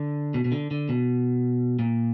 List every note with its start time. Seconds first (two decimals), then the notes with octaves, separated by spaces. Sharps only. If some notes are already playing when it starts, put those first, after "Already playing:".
Already playing: D3
0.34 B2
0.45 B2
0.52 D3
0.71 D3
0.89 B2
1.79 A#2